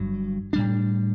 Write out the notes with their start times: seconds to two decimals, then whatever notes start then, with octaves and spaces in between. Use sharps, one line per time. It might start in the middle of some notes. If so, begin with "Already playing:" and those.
Already playing: G1 G2 F#3
0.53 A2 G3 D4